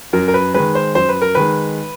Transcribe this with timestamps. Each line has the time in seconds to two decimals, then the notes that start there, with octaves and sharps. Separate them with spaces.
0.13 F#2 A#4
0.28 A#4
0.34 B4
0.54 D#3 G#3 B4
0.75 C5
0.95 F#2 C5
1.09 B4
1.22 A#4
1.35 D#3 G#3 B4